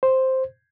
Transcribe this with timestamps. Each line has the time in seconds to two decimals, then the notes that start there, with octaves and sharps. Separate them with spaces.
0.03 C5